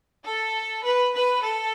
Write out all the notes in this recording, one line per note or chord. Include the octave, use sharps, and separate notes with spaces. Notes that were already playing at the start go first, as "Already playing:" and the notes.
A4
B4
B4
A4